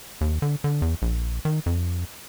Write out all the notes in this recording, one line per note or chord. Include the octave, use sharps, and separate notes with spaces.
D#2
D3
D3
E2
A#1
D#3
F2